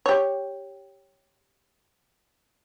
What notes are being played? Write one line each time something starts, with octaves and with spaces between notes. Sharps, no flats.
G4 C#5